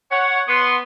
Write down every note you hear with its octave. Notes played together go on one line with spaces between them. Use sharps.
C#5 F#5
B3 C6